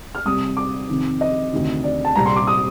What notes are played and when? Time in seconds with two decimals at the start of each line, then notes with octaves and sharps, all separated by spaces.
0.15 F6
0.25 C2 C3 G3 D#6
0.57 D6
0.89 F2 C3 D#3
1.21 D#5
1.52 D2 C3 D#3
1.84 D5
2.05 A5
2.15 C2 A#2 G3 C4 A#5
2.26 C6
2.36 D6
2.47 D#6